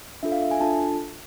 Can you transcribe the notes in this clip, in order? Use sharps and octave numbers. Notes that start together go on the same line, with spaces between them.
D4 F4 A4 E5
F5
E5
G#5
D4 F4 A4 A5